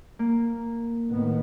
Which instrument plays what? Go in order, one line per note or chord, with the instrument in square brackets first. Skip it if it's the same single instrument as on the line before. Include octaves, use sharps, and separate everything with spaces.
[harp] A#3
[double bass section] A2 D#3 B3